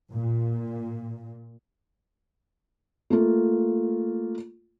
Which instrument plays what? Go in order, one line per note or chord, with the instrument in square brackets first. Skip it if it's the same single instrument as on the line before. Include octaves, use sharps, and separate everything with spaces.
[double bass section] A#2
[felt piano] A3 A#3 F4